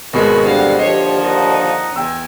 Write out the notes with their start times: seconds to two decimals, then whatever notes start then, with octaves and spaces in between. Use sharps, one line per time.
0.13 G#1 B2 G#3 F#4 A#4 B5 C#6
0.43 D3 G3 C5 F5 F#5
0.79 D#2 D3 F3 G4 C#5 D#5 C7
1.20 D#4 F#5
1.96 E2 G5 G#5 E6